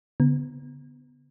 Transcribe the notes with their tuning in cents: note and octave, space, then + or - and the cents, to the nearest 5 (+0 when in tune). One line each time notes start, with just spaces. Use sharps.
D3 -40 B3 +10